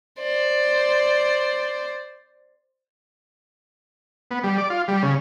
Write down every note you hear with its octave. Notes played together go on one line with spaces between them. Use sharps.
C5 D5
B3
G3
D5
F4
G3
C#3